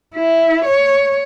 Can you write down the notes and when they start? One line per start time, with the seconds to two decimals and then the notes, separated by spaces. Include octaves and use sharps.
0.14 E4
0.65 C#5